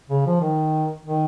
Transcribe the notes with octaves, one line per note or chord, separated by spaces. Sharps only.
C#3
F3
D#3
D#3